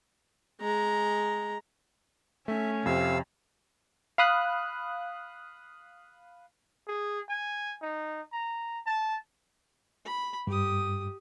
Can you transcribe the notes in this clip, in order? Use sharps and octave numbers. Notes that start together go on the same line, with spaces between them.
G#3 A#5
A3 C#4 E5
F2 C3 F5 E6
F5 B5 D#6 F#6
G#4
G#5
D#4
A#5
A5
B5
G2 G4 D#6